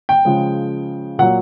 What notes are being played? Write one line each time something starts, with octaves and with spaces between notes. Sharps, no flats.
G5
C#3 F3 G#3
A#2 F#3 F#5